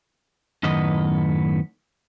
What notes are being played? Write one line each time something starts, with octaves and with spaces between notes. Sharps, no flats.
F#2 A2 D#3 B3 D#5